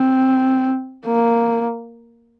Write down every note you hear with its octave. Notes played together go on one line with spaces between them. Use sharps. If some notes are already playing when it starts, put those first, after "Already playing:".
Already playing: C4
A#3